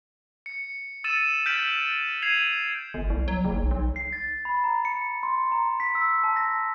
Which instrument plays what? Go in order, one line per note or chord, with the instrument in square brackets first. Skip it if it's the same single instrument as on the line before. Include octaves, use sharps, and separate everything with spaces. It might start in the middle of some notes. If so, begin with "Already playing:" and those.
[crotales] C#7
E6 A6 C#7 D#7 E7
F6 G6 A6 B6 D7 F#7
G#6 C7 D#7 F7 F#7
[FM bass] G1
C2
F#3
F#1
B1
B1
[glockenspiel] C7
A6
B5
A#5
C#7
C6
A#5
B6
E6
A5
A#6